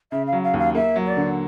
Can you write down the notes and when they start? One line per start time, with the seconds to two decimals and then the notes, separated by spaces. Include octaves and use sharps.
0.12 C#3 E5
0.27 F5
0.33 F#3
0.44 F5
0.54 D#2
0.59 F5
0.75 A#3 E5
0.96 F#3
1.07 D5
1.17 D3